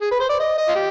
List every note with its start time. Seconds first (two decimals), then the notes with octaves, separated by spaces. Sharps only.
0.01 G#4
0.11 B4
0.20 C5
0.29 D5
0.40 D#5
0.58 D#5
0.68 F4
0.75 G4